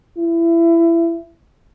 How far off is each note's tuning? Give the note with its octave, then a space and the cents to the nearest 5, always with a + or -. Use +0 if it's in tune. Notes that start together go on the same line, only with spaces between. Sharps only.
E4 +25